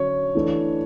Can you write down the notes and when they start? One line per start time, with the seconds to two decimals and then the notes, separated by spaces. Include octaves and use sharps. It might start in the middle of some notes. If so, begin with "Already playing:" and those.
Already playing: D3 F#3 C#4 C#5
0.35 E3 A3 D4